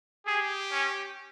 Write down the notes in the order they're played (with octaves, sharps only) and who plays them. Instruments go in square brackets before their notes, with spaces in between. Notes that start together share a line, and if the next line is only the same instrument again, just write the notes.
[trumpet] G4 [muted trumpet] G#4
[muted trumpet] C#4